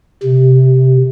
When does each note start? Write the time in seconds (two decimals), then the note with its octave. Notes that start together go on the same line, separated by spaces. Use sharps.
0.23 C3